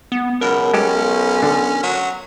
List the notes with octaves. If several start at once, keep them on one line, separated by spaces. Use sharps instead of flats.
B3
C#2 F#2 B2 A#4
B1 G#3 C#4 G4 A4
D3
F#3